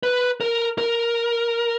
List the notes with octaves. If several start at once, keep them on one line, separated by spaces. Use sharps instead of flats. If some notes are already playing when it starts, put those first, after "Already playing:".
B4
A#4
A#4